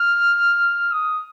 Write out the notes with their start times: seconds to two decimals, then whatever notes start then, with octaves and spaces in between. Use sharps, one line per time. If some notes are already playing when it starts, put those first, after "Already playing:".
Already playing: F6
0.92 D#6